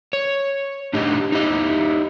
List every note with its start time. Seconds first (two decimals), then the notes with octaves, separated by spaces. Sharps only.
0.13 C#5
0.93 A2 D4 D#4 G4 D#5
1.32 D#4 E4 G4 D#5